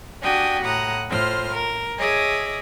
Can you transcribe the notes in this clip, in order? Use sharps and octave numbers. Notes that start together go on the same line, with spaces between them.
D4 F#4 G4 G5 G#5 D#6
A2 F#5 A#5 D#6
A2 F4 C5 F6
A#4
G#4 C#5 D#5 E5 D6 D#6